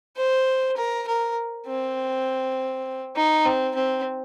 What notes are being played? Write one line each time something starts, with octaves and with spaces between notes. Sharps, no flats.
C5
A#4
A#4
C4
D#4
C4
C4